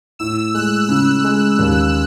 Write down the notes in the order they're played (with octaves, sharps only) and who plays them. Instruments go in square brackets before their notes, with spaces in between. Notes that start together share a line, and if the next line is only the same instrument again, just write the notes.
[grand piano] A2 [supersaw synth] E6
[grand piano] G#3 [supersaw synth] F#6
[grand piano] C#3 [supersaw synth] E6
[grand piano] G#3
D#2